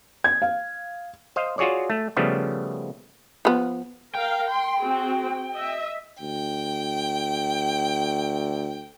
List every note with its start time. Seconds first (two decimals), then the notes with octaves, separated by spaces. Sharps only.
0.24 G#6
0.42 F5
1.36 C5 D#5 F5
1.58 F4 F#4 G#4 C#5 D5
1.90 A3
2.17 C#3 F3 G3 A3 B3
3.45 F3 B3
4.15 A#4 F5 G5
4.50 C6
4.82 C4 F#4 G#4
5.54 D#5 E5
6.22 D2 G5